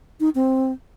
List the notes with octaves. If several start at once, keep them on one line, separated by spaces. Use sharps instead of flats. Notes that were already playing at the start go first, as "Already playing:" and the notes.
D#4
C4